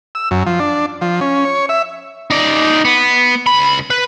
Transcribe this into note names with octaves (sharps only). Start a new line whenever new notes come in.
E6
F#2
F3
D4
F3
C#4
C#5
E5
D#4 D5
B3
C#2 B5
B4